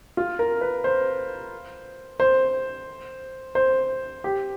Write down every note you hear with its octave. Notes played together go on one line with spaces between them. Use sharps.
F4
A#4
B4
C5
C5
C5
G4